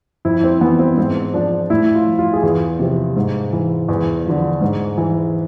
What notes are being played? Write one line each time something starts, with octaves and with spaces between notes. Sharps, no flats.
F2 E4
C4
E3 B3
C4
G#2 C4
F3 D4
A2 E4
F4
F3
F4
G#4
E2 F4
C3 F3
G#2
E3
E2
D3 F3
G#2
E3